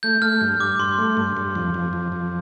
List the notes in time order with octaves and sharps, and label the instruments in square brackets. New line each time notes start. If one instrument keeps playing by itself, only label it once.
[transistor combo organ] A3 [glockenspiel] G6
[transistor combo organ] A3 [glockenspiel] F6
[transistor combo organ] G2
[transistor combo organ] G2 [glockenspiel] D6
[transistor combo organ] G2 [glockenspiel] C6
[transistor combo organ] A3
G2
G2
F2
F2
F2
F2